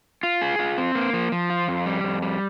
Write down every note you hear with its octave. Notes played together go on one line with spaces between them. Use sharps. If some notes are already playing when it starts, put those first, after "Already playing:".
F4
G#4
F4
C4
A#3
F3
F3
F4
F2
G3
F2
G3